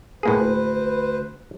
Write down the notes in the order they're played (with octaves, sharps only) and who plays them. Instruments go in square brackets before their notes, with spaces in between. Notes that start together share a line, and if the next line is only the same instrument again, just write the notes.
[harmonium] D2 B4 C5 [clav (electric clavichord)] A2 A#3 G#4